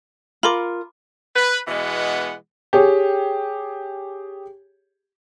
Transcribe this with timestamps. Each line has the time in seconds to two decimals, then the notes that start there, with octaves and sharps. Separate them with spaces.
0.43 F4 A#4 B5 C6 D6
1.35 B4
1.68 B2 E3 G#3 B3 F#5
2.73 G4 G#4 C#5